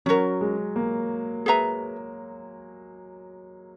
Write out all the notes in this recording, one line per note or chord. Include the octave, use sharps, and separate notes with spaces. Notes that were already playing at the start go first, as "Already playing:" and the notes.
F#3 C#4 F#4 A#4
G#3
A#3
G#4 B4 E5 A#5